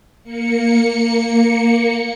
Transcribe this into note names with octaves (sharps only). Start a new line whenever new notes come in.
A#3 C#7